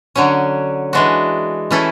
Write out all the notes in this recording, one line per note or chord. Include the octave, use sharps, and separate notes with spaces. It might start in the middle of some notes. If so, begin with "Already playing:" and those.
D3 F#3 C#4
E3 G#3 D4 F#4
E3 A3 C#4 E4 A4